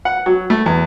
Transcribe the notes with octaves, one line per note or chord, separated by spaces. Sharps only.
F#5
F#3
A3
E2